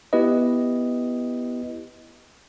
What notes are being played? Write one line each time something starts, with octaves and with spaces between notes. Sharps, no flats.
B3 E4 G4 B4 D#5